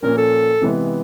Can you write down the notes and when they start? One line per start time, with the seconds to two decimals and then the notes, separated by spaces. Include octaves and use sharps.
0.03 A#2 F3 A#3 C#4 A#4
0.17 A4
0.61 C3 E3 G#3 B3